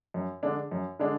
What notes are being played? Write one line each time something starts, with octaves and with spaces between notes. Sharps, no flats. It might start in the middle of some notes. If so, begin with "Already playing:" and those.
F#2
D3 G#3 D4
F#2
D3 G#3 D4